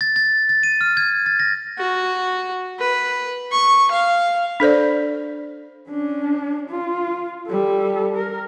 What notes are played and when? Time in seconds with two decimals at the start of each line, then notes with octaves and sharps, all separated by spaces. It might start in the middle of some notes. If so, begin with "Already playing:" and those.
0.01 A6
0.16 A6
0.49 A6
0.63 D#7
0.81 F6
0.97 G#6
1.26 A6
1.40 A#6
1.78 F#4
2.80 B4
3.52 C#6
3.91 F5
4.60 D4 A4 C5 D5
5.90 C#4 D4
6.70 F4
7.48 G3 A4
8.16 A#4